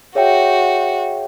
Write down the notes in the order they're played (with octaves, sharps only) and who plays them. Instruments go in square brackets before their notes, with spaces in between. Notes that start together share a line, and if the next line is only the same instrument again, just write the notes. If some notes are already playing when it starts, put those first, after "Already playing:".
[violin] F#4 [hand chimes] G#4 C#5 E5 G5